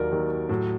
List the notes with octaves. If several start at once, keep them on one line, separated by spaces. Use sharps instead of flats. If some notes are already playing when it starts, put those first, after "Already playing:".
Already playing: D#2 D#3 F#3 A#4 D5
D#2 D#3 F#3
A2 F#3